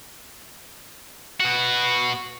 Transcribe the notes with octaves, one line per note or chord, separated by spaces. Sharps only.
B2 F#4